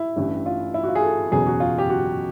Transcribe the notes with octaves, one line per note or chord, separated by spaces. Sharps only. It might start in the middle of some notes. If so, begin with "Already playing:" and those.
Already playing: E4
A1 G2 E3
F4
E4
F#4
F4
G#4
A4
F#1 E2 B2 F#3 G#4
F#4
F4
G4
F#4